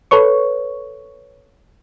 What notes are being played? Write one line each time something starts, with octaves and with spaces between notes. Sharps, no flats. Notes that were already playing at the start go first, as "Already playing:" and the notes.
A4 B4 C#5 C#6